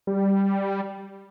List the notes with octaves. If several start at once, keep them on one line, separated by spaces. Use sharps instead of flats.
G3